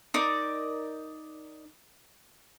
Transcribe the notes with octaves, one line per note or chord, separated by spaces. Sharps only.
D#4 A#4 D5